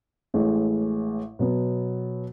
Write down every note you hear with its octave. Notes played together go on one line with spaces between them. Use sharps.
A1 A2 G#3
B2 F#3 B3